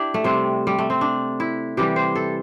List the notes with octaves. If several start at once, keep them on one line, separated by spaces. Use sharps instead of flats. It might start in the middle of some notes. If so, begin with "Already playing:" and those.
Already playing: D4 E4 G4
A3
C3 G3 C4
G3
A3
C4
D4
E4
C3 E3 G3 G4
C5
A4